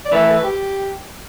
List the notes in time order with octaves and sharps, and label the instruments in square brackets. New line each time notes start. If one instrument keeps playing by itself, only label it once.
[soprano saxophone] D5
[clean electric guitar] E3 A3 E4 [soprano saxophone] B4
[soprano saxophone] A4
B4
G4